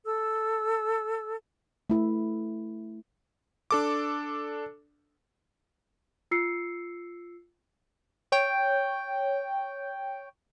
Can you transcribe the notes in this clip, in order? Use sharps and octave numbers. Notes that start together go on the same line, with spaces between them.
A4 E6
A3 E4
D4 A4 D6
F4 E6 C7 C#7
C#5 G5